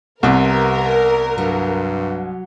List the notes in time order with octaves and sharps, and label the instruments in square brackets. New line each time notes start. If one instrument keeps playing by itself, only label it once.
[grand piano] C2 [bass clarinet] C3 [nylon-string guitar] B3 C4 [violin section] A#4
[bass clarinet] G2 [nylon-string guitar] F#3